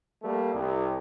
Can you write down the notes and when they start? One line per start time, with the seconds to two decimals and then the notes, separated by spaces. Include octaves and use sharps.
0.22 G3 A3 A#3
0.54 C2